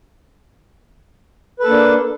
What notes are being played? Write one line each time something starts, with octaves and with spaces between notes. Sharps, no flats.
A#3 D4 A4 B4